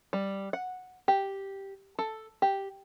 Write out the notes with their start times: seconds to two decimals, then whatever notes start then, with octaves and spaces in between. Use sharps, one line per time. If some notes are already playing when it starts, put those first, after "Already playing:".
0.13 G3
0.53 F#5
1.08 G4
1.99 A4
2.42 G4